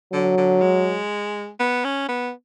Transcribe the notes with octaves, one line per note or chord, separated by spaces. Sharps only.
D3 F#3
D3
G#3
B3
C#4
B3